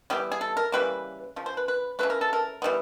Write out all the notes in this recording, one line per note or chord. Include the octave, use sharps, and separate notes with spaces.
E3 G3 B3 G4
G#4
A4
A#4
C#3 E3 G3 A#3 B4
C#3 F3
C5
B4
B4
C#3 E3 A3 B4
A#4
A4
A#4
E3 G3 B3